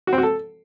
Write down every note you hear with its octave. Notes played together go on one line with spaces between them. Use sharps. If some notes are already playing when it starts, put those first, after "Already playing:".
F#4
C4
F#4
A4